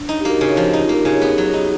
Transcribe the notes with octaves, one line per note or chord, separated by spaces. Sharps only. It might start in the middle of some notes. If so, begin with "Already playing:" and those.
Already playing: D4
D#4
G4
A#3 F#4
C#3
F3 F4
D#4 F4
A#3
G4
C#3
G#4
B3 G4
F#3
D#4